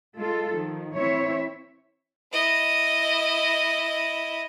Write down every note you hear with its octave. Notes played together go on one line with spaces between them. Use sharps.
G#3 F4 A4
D#3 F3
E3 C4 E4 C#5 E5
E4 D#5